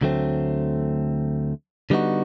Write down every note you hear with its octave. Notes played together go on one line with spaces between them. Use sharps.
D2 D3 F#3 A3 C4
D3 G3 B3 D#4 F#4